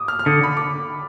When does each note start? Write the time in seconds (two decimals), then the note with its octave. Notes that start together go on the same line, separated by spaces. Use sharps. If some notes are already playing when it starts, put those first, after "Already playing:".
Already playing: D6 D#6
0.08 F6
0.19 F6
0.26 D3 D#6
0.44 B5
0.57 D6